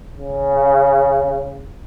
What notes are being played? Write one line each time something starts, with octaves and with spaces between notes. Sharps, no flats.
C#3